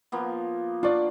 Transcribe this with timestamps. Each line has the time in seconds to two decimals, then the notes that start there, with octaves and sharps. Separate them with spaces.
0.12 F3 A#3 B3
0.83 D4 F4 D5 C#6